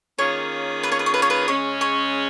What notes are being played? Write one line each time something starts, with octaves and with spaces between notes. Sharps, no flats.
D#3 A#3 C#4 F4 G#4 C#5
B4
C#5
B4
C#5
B4
C#5
B4
C#3 G#3 C#4 C#5
C#5